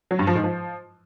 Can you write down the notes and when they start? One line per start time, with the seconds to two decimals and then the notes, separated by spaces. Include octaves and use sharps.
0.11 F#3
0.19 G2
0.27 F3
0.35 G#2
0.44 F3